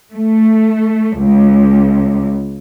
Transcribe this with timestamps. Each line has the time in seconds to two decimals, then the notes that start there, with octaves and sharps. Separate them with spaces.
0.14 A3
1.19 C#2